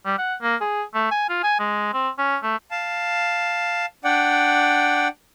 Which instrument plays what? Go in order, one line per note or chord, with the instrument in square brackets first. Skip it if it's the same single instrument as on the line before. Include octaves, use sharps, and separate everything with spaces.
[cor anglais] G3
F#5
A#3
G#4
A3
G#5
F4
G#5
G#3
C4
C#4
A3
[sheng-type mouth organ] F5 A5
D4 D5 F#5 G5